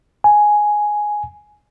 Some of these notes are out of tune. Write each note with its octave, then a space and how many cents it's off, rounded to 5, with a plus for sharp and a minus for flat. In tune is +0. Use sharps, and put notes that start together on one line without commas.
G#5 +5